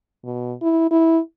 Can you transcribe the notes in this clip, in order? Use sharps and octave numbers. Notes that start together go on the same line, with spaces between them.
B2
E4
E4